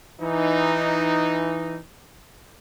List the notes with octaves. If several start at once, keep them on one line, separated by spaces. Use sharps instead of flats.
E3 D#4